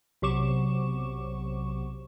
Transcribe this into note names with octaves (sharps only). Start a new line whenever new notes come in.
B1 C3 F#3 C#6 D6 E7